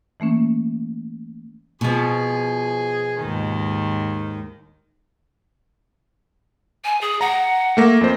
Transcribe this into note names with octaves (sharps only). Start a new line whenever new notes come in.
E3 A3 A#3 C#4
B2 F3 G#4
D#2 G#2 D#3
G#5
G#4
F#5 A#5
A3 A#3 A#6
F2 C5